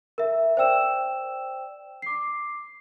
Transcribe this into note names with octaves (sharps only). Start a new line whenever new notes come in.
A#4 E5
C5 D5 G5 E6 E7
D6 C7